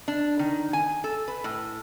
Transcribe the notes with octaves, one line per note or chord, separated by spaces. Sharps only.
D4
D#3
G#5
A4
B4
A2